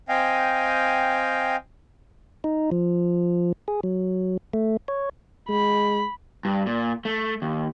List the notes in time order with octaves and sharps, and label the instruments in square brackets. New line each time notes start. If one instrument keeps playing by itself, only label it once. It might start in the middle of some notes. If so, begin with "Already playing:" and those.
[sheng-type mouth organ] C4 D#5 F5 G5 G#5
[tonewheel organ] D#4
F3
G#4
F#3
A3
C#5
[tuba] G#3 [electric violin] B5
[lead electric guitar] G2
A#2
A3
D#2